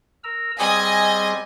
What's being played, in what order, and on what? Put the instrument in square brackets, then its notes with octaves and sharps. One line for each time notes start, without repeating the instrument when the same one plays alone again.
[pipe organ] A#4 A#5 E6
[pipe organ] G3 C4 G#4 [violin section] D#5 G#5